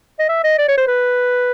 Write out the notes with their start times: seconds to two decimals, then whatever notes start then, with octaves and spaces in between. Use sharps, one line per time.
0.19 D#5
0.29 E5
0.44 D#5
0.58 D5
0.68 C#5
0.78 C5
0.88 B4